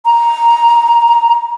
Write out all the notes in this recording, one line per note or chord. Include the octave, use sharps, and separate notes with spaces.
A#5